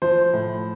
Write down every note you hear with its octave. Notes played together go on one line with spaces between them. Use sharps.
F3 C5
A2